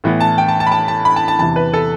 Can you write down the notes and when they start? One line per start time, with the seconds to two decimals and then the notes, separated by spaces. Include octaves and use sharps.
0.04 A2 E3 B3
0.21 A5
0.38 G5
0.48 A5
0.60 A5
0.67 B5
0.72 A5
0.88 A5
1.05 B5
1.16 A5
1.28 A5
1.39 E2 C3 E3 A5
1.56 B4
1.74 A4